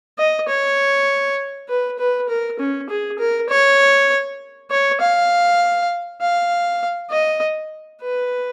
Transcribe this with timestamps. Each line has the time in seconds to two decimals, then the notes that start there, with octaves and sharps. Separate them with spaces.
0.18 D#5
0.48 C#5
1.69 B4
1.99 B4
2.29 A#4
2.59 C#4
2.89 G#4
3.19 A#4
3.49 C#5
4.71 C#5
5.01 F5
6.21 F5
7.10 D#5
8.01 B4